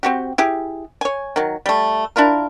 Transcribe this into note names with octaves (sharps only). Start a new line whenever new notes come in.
C4 F#4 G4
E4 G4 G#4
C#5 G#5
D#3 F#3
G3 A3
D4 E4 F4 A#4